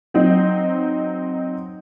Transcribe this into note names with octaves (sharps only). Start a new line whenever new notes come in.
F#3 C4 D#4